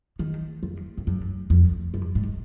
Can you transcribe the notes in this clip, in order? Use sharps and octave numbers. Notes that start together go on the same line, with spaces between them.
D#3
F2
F2
F#2
F2
F#2
G#2